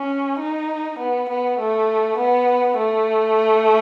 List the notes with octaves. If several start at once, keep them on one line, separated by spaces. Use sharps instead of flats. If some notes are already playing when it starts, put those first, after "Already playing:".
Already playing: C#4
D#4
B3
B3
A3
B3
A3